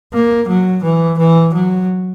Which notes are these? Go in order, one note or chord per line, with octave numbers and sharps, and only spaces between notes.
A#3
F#3
E3
E3
F#3